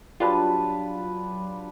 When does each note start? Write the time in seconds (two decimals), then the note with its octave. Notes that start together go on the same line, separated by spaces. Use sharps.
0.20 F#3 G3 D4 F4 B4 A5